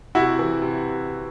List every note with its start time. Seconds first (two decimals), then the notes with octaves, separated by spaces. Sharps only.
0.15 C3 E4 F#4
0.39 E3
0.62 C3